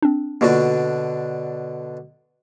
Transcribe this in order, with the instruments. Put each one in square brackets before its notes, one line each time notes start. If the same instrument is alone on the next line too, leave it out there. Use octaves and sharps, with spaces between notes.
[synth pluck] C4 D4
[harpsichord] B2 D3 D4 [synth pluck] A#3 F4 F#4